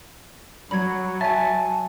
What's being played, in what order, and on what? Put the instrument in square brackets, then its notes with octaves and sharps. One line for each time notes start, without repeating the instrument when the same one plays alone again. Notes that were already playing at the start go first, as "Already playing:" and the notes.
[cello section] F#3 [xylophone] B5 G#6
[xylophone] E5 G#5 [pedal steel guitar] A5